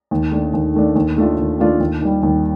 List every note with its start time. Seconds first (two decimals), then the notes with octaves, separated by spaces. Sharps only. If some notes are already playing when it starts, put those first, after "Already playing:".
0.11 D#2
0.31 D#3 A3 D4
0.54 D#2
0.74 D#3 A3 D4
0.96 D#2
1.16 D#3 A3 D4 F4
1.39 D#2
1.59 D#3 A3 D4 F4
1.80 D#2
2.01 D#3 G3
2.23 D#2